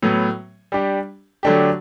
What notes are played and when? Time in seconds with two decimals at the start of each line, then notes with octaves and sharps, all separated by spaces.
0.02 A2 F#3 B3
0.72 G3 D4 G4
1.43 D3 F#3 A3 D4 G4